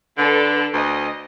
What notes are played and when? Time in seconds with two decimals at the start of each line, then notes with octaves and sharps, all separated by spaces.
0.18 D3 D4 A4 B4
0.74 D2 D#5